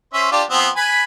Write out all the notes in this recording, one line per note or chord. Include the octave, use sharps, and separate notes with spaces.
C#4 C5 E5
D4 F4 G4
F3 B3 C4
B4 G#5 B5